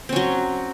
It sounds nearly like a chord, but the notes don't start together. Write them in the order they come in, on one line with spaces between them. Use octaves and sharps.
C4 C#4 F#3